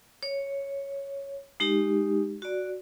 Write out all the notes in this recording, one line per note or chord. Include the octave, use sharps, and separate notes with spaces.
C#5
G#3 D#4 G4
F#4 D5